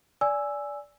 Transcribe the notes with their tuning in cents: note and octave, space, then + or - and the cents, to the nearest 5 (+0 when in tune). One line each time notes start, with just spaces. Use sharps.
D5 -15 G#5 +0 E6 +0